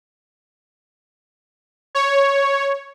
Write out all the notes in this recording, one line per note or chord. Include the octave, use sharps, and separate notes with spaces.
C#5